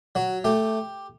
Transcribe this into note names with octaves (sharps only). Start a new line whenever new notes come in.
F#3 F#4
A3 G4